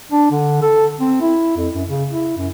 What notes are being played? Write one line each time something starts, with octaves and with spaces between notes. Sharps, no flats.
D4
D3
A4
C4
E4
F2
F#2
C#3
E4
F#2